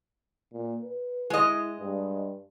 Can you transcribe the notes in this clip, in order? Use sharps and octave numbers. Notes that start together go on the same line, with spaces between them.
A#2
B4
G#3 E4 D#5
G2